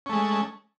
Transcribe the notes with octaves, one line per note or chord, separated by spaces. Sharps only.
G#3 A3 C#4